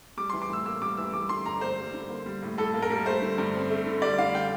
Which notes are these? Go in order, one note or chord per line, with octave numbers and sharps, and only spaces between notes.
G3 D6
E3 C6
D6
A2 E6
A#3 E6
G3 D6
E3 E6
G3 D6
D3 C6
G2 A#5
A#3 C5
G3
D3
A#3
G3
A2
A2 A4
A#3
A#4
G3
A3 C5
D3
G2
C4
A3
D3
G3 D5
D3 F5
G5